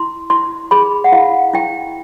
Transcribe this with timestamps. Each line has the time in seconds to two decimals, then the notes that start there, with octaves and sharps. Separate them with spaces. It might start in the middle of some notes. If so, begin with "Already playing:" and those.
Already playing: E4 C6
0.30 E4 C6
0.71 G#4 B5
1.04 F#5
1.12 E4 F5
1.53 E4 G5